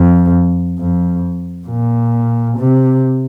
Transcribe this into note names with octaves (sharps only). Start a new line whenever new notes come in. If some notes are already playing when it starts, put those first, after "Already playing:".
Already playing: F2
F2
A#2
C3